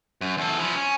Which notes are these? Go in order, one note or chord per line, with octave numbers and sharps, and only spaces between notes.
F#2
E2 A4
F3 E4
C#4